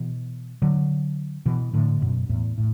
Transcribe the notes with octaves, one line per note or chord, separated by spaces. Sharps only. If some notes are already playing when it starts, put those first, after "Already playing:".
Already playing: B2 E3
D3 F#3
B2 E3
A2 D3
F#2 B2
E2 A2
A2